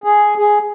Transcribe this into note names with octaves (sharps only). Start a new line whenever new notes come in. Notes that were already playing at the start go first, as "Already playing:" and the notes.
G#4
G#4